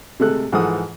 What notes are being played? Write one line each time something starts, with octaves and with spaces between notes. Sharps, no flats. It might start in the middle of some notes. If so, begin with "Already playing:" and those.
C3 G#3 A3 A4 F#6
G#2 E3 F3 A4 F#5 D#6